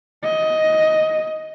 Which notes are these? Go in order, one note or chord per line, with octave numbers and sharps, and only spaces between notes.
D#5